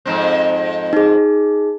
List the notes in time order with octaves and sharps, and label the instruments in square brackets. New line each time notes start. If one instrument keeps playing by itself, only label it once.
[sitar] F2 G#2 C4
[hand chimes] D#4 G#4